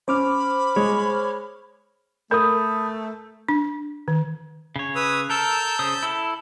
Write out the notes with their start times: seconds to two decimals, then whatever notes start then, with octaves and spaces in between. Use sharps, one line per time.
0.08 C#4 C5 B5 D6 F6
0.76 G#3 C#5
2.31 A3 A#4 B5 D#6 G6
3.49 D4
4.08 D#3
4.76 C#3 C#5
4.95 B4 D#6 E6
5.30 A4 A#4 A5 E6 G6
5.79 C#3 C5 D#6
6.03 E4 A4